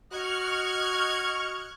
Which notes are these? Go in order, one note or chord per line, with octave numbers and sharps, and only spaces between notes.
F#4 D#5 C#6 F6 F#6 G#6